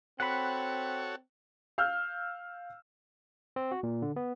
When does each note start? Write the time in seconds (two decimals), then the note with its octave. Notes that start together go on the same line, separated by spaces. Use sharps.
0.20 C4 F#4 A4 C#5 F#5 B5
1.78 F5 E6 F6 G6
3.56 C4
3.72 F#4
3.83 A#2
4.02 D3
4.16 B3